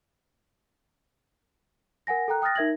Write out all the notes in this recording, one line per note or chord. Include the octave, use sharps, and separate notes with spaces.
A#4 F#5 G#5 A#6
A4 G5 A#5 F#6
G5 D#6 F6 F#6 A6 A#6
D#4 A#4 E5 G#6 A#6 F#7